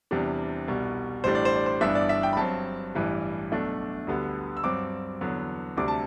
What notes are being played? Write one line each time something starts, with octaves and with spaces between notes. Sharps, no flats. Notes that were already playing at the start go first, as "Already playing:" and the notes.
E2 C3 G3 D4
C2 B2 G3
A1 A2 G3 D4 C5
D5
C5
D5
C5
G1 G2 E3 B3 D4 E5
D5
E5
G5
B5
G2 F#3 C4 A5
A1 G2 E3 G3
B1 B2 A3 D4
D2 D3 G3 B3
E6
G2 F#3 C4 D6
E2 D3 F#3 B3
D2 C3 G3 D4 D6
A5